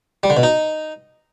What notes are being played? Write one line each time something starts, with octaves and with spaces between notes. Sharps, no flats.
G3
D3
B2
D#4